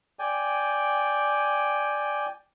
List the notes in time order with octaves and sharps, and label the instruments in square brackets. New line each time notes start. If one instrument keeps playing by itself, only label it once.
[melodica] D5 G5 G#5